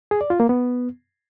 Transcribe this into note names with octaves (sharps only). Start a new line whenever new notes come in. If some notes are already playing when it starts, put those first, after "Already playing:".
G#4
D5
F4
A#3
B3